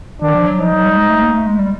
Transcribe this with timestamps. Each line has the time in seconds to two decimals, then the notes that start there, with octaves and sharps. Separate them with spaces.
0.22 D#3 D4
0.34 F3
0.47 F#3
0.59 F3 D#4
0.72 F#3
0.85 G3
0.97 G#3
1.09 A3
1.22 A#3
1.34 A3
1.47 G#3
1.59 G3